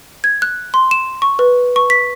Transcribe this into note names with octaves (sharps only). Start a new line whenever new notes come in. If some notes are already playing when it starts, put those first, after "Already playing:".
G#6
F#6
C6
E7
C#6
B4
C#6
B6